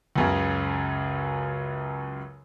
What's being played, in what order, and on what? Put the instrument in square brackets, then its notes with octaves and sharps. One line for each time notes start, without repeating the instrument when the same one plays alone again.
[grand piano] C#2 F#2 C#3